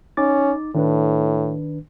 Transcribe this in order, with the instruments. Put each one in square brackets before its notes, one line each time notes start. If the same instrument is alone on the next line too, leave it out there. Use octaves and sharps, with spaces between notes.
[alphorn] C#4 [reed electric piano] D#4 D6 A6
[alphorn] A2 [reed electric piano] D#3 D4 B4